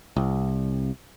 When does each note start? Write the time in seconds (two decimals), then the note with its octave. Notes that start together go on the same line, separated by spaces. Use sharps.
0.16 C2